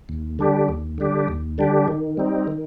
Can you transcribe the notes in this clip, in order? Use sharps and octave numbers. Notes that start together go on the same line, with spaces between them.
D#2
D3 G3 D4 G4
D#2
D3 G3 D4 G4
D#2
D3 G3 D4 G4
D#3
G3 C4 D#4
D#3